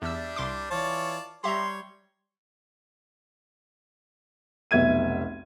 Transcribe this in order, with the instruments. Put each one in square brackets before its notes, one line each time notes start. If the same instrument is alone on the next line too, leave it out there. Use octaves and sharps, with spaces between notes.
[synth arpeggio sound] E2 E6 [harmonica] G3 D4 [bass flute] E5
[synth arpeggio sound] C2 C6 D6
[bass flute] E3 [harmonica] F4 D5 A5 [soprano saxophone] C#5
[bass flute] G3 [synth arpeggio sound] G4 E5 A#5 [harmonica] C#5 [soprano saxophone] C6
[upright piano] F1 B1 E5 G#6 D#7